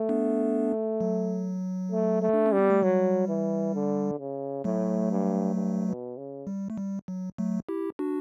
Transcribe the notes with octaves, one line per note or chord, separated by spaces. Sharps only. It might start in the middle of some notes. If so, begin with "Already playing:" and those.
Already playing: A3
B3 D4
F#3
A3
A3
D4
C#4
G3
B3
A3
F#3 G3
E3
D3
C#3
A2 F#3 A3
G2
G2
B2
C#3
G3
A3
G3
F#3
F#3 A3
E4 G4
D4 F#4